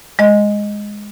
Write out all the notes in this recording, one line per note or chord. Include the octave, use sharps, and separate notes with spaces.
G#3 D#5